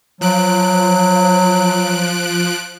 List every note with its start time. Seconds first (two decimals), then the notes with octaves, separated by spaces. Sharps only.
0.21 F3 F#3 F#6 D7